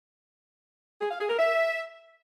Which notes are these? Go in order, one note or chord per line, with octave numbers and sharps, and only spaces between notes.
G#4
F5
G#4
A#4
E5